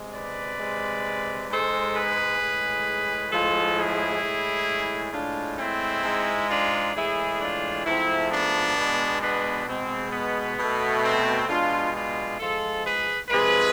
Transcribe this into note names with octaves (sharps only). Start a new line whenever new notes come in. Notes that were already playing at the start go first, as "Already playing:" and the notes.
Already playing: C3 G#3
B4 D5
C3 G#3
G#2 G#3 A4 C5
G#4 B4
A2 G#3
A2 F3 G#3 F4 A4
E4 G#4
A2 G#3
A2 G#3 D4 F4
C4 E4
G#2 G#3
D4 F4
A2 E3 G#3 E4 G#4
D4 F4
G#2 F3 A3 C4 E4
B3 D4
B2 G#3
B3 D4
B2 G#3 C4
B3
B2 A3
C4
B2 G#3 D4 F4
D4 F4
G#2 F3 G#3 F4 A4
G#4 B4
C3 F3 G#3 G#4 B4